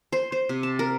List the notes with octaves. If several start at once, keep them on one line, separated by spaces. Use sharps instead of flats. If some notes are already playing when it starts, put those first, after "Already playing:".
C5
C5
C3
A5
A#4